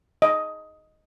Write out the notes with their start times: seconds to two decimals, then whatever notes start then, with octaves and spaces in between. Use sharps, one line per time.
0.22 D#5